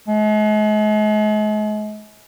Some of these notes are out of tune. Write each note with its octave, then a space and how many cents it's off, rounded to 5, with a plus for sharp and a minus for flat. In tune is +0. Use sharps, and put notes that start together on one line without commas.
G#3 +40